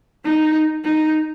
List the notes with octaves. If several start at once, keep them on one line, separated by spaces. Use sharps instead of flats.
D#4
D#4